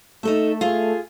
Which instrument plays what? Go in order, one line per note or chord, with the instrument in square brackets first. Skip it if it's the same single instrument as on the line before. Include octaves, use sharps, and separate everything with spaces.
[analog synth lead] A3 [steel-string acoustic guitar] D#4 A4 E5
[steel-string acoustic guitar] F4 G#4